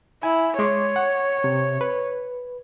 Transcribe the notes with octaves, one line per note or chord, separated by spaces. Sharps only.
E4 G#5
G#3 C#5 C6 D6
F#5
C3
B4